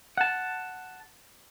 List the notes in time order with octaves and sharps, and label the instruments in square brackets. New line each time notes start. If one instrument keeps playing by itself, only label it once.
[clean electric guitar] F#5 A5